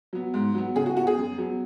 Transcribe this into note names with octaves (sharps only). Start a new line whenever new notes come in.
F#3 B3
G#2
F#3 B3
C#3 G#4
F#4
B3 F#4
G#4
F#2
F#3 B3